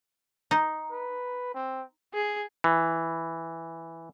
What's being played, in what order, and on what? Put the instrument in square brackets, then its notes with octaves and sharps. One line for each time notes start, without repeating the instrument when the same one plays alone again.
[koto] D#4
[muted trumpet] B4
C4
[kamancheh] G#4
[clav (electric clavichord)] E3